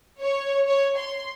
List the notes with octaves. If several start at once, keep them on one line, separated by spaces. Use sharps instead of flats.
C#5
C#5
C6